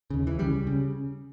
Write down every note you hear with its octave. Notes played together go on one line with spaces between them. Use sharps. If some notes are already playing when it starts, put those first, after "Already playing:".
D#2 C#3
E3
C#2 C#3 G3
C#3